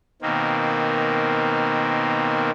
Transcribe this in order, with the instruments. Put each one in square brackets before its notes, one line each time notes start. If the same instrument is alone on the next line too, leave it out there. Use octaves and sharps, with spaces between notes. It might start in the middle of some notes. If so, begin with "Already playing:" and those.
[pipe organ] B2 D#3 A#3 C4